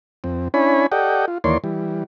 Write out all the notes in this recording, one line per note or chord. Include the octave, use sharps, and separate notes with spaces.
F2 C4
C#4 D4 E4 C#5 G#5 B5
G4 A4 D5 D#5 F#5 G5
F4
D#2 E3 A#3 C#5 D5 C6
E3 G3